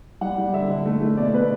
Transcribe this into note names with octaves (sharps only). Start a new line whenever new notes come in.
G3 F#5
G3
D3 E5
D3
A3
A3
B2 D5
B2 B4